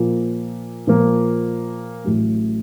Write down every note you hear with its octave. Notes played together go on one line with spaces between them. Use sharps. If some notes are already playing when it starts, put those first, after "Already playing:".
Already playing: A#2 F3 A#3
A#2 F3 A#3
A1 A2 F#3 A3